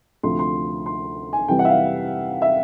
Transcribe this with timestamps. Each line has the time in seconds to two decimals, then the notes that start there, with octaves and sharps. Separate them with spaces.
0.23 D2 C3 F3 C6
0.39 C6
0.86 C6
1.33 G#5
1.48 F2 C3 E3 G3 G5
1.59 F#5
1.65 E5
1.69 F5
2.42 E5